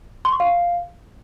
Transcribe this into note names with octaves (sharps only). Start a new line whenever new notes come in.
C6
C#6
F5